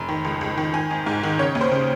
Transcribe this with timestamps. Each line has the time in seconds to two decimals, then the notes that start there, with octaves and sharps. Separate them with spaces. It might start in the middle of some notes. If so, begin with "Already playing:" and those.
Already playing: F1
0.09 D#3
0.25 C#2
0.41 C#2
0.58 D#3
0.74 D#3 G#5
0.91 G#1
1.06 G#2
1.23 D#3
1.39 C#3 C#5
1.55 D#2
1.61 C5
1.72 C#3